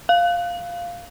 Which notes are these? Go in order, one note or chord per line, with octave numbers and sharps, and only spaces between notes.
F5